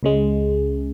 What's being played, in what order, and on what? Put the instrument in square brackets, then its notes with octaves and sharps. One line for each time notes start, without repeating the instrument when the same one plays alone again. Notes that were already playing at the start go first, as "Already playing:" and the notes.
[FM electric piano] C#2 C#3 G#3